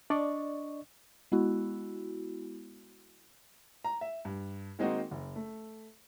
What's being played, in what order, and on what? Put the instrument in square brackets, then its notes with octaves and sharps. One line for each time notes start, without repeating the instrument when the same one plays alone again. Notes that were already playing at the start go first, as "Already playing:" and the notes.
[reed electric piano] D4 D5 D#5 C#6
[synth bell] G#3 B3 E4 F#4
[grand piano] A#5
E5
G2
D#3 G#3 A#3 C4 D#4 F#4
F#1
A3